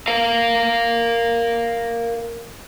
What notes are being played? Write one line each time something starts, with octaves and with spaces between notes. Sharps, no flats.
A#4 F5